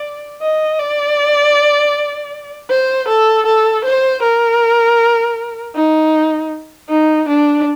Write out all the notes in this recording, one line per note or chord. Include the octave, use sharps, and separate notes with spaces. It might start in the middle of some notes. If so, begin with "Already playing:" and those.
Already playing: D5
D#5
D5
C5
A4
A4
C5
A#4
D#4
D#4
D4